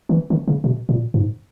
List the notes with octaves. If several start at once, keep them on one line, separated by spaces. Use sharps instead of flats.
D#3
E3
D#3
C#3
B2
A#2
G#2